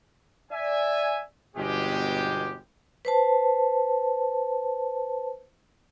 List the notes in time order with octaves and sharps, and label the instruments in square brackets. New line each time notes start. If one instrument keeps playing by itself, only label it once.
[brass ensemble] D5 E5 G#5
G1 B2 G#3 C#4 G4
[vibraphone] B4 C5 A5